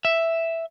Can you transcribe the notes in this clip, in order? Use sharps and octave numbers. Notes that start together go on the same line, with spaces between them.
E5